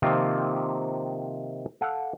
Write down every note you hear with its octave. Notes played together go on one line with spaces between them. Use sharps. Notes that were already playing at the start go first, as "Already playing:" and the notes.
C3 D#3 F3 A#3 C4 F4
A4 F5 F#5